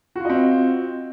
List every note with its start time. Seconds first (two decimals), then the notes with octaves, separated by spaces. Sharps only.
0.16 F#4
0.20 F4
0.25 D#5
0.30 C4